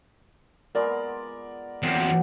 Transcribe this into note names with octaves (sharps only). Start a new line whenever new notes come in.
G#3 B3 F4 A#4 D5
E2 A#2 F#3 A#3 C4